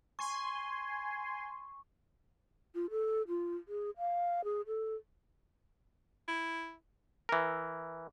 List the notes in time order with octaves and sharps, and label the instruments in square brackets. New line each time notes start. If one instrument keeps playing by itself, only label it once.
[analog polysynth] G#5 C6 [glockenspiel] C#6
[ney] F4
A4
F4
G#4
F5
G#4
A4
[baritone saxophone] E4
[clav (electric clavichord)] E3 A#4